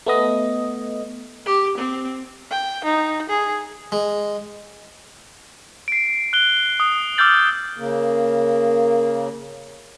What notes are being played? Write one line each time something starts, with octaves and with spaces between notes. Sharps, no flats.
A3 B3 D#5
G4
C4
G5
D#4
G#4
G#3
C7 D7
F#6 G7
D#6
D6 E6 F6 G6 A6 F#7
C#3 A#3